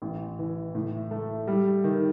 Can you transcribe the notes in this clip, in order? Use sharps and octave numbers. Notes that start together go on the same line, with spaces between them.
A1
E3
A2
A3
G3
D#3